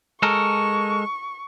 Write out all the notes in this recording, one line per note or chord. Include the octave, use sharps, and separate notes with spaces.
G#3 A4 A#4 C#6